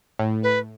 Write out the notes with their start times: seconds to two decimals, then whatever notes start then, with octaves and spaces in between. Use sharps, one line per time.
0.19 A2
0.43 B4